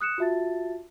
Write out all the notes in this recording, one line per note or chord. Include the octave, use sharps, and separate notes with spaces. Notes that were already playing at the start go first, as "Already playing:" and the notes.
D#6 F#6 C#7 E7
F4 F#4 E5 A5 A6